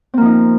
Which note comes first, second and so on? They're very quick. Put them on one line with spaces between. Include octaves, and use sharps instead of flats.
C4 A#3 F3 D#4